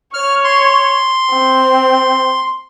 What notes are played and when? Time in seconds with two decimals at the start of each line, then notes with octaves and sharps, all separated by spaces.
0.14 C#5 F6
0.44 C6
1.32 C4